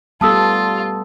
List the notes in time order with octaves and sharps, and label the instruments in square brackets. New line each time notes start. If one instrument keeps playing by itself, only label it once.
[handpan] G3 B3 A4 [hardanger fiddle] F4 [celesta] A5 D#6 E6